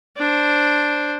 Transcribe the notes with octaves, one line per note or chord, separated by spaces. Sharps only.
D4 C5